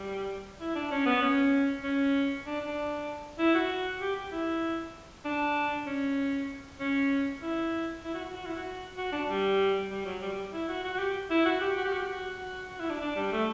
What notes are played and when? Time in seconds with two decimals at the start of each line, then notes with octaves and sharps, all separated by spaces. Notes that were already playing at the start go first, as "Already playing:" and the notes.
Already playing: G3
0.60 E4
0.75 D4
0.91 C#4
1.06 B3
1.21 C#4
1.84 C#4
2.46 D4
2.61 D4
3.39 E4
3.55 F#4
4.01 G4
4.16 G4
4.32 E4
5.25 D4
5.86 C#4
6.80 C#4
7.42 E4
8.04 E4
8.14 F#4
8.24 F#4
8.35 F#4
8.46 E4
8.56 F#4
8.98 F#4
9.12 D4
9.29 G3
9.90 G3
10.05 F#3
10.22 G3
10.32 G3
10.53 E4
10.68 F#4
10.84 F#4
10.94 F#4
10.99 G4
11.30 E4
11.45 F#4
11.61 G4
11.76 F#4
11.84 G4
11.92 F#4
11.99 G4
12.07 F#4
12.38 F#4
12.69 F#4
12.80 E4
12.90 D4
13.01 D4
13.16 G3
13.32 A3